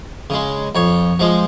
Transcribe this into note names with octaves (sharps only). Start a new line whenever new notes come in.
C#3 G#3
F2 C#5
F3 G#3